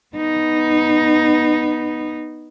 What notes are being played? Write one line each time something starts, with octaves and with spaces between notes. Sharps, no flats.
B3 D#4